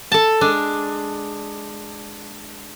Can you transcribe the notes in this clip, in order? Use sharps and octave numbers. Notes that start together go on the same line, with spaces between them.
A4 A5
G#3 D4